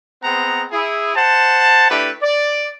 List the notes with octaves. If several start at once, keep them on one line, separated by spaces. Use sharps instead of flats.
G#3 B3 C4 F#5 A#5
E4 G#4
C5 F#5 A5
A3 D4 E4 G4 B4
D5